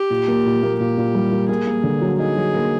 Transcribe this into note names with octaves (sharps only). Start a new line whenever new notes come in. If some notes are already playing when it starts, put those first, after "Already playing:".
Already playing: G4
A#2
A#3
A#2
A#3
A#2 G4
A#2
G3
A#3
A#3 G#4
A#3
D3
F#3
D#4 G#4
F#3
A#3